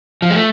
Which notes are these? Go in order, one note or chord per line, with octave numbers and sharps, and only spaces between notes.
F3
G#3
A3